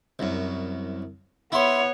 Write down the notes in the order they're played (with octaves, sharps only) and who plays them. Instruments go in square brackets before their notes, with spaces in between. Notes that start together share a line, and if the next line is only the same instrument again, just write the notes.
[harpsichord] C2 F#2
[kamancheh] B3 C#5 [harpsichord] E4 C6